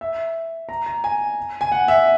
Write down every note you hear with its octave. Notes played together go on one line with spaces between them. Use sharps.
E5
A#5
A#5
G#5
G#5
F#5
E5